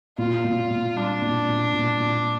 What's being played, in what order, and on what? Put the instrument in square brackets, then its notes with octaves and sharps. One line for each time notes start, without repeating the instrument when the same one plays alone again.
[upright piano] A#2 [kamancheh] F4
[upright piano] A#2
A#2
[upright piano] G3 [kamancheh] D4
[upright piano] A#2
A#2
A#2
A#2